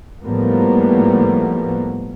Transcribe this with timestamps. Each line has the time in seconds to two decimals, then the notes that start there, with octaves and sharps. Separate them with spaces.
0.25 A2 F3 G3 A#3 B3